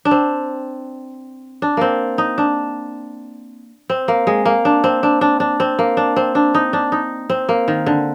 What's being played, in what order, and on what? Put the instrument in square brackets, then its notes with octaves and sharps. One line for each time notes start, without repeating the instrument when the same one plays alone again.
[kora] D4
C4
D4
A#3 C4
D#4
D4
C4
A#3
G#3
A#3
D4
C4
D4
D4
D4
C4
A#3
D4
C4
D4
D#4
D4
D#4
C4
A#3
D#3
D3